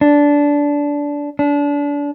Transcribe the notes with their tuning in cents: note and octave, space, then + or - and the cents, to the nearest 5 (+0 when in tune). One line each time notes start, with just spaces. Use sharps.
D4 -15
D4 -30